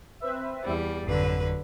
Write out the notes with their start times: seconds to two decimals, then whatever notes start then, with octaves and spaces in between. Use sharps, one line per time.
0.20 C4 B4 E5
0.64 E2 G3
1.06 G#1 F2 D3 F#3 B4